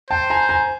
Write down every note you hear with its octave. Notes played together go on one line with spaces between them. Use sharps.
C5 G5 A5
G#5 A#5
G#5 A#5